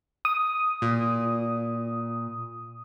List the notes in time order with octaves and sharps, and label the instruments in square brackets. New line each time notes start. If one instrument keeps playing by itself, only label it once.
[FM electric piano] D#6
[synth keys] A#2